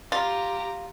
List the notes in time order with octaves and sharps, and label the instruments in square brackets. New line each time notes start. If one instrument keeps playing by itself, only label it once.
[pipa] F4 [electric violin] G4 A#5